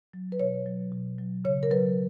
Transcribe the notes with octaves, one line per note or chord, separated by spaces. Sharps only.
F#3
B4
B2 C#5
F#3
B2
F#3
C#3 C#5
A#4
F#3 B4